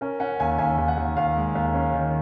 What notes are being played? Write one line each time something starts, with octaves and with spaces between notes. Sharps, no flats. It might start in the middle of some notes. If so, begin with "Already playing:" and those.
C#4 A#4
C#4 F#5
D#2 G#5
D#2 G#5
D#2
F#5
D#2
D#2 F5
G#3
D#2
C#4
D#3